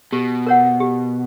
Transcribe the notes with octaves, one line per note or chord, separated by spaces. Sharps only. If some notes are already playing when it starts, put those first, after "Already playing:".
B2 G4
A#4 C#5 F#5
G4